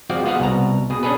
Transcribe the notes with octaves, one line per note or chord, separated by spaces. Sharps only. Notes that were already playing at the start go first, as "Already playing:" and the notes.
F3 G#3 C4 F4 F#4 D5
B3 F4 F#4 G#4 F5 F#5
C2 B2 A#5
B2 G#4
C#4 D4 G#4 A4 B4